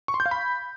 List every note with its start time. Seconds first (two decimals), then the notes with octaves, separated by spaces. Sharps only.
0.08 C#6
0.14 C6
0.20 G6
0.26 F5
0.31 B5